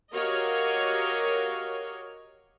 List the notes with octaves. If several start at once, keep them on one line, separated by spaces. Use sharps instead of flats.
F#4 G4 A#4 C#5 D#5 F5